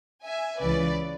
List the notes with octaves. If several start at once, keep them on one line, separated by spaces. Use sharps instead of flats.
E5 G#5
C#2 C#3 E3 B4 D5